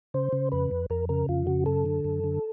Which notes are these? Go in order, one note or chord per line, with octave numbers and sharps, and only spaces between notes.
C#3 C5
C#3
F2 B4
F2
F2 A#4
C#3 A#4
F2 F4
C#3 F#4
F#2 A4
D3
F#2
D3